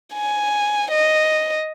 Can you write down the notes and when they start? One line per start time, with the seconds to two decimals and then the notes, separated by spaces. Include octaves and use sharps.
0.14 G#5
0.91 D#5